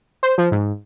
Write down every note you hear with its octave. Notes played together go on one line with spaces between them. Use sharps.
C5
F3
G#2